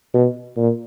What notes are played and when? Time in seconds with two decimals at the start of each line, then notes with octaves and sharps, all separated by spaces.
0.14 B2
0.57 A#2